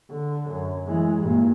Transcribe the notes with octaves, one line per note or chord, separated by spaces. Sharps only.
D3
F#2
E3 G#3
G2 A#2